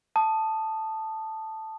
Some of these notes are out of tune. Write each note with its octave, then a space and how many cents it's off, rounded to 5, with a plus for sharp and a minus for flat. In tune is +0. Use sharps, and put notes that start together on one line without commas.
A5 +0 D#6 -15